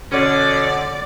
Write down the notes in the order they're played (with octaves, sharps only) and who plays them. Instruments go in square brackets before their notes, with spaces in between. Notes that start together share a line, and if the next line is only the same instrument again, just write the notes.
[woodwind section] B2 D3 [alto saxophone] C#4 [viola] D5